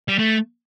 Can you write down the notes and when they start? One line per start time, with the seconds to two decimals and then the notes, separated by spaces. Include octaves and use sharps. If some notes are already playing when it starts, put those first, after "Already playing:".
0.08 G3
0.19 A3